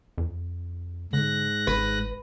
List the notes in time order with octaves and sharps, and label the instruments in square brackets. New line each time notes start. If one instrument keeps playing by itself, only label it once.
[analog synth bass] F2
[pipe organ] G#2 F#6 A#6 [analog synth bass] D3
[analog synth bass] G#1 [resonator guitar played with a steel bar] B4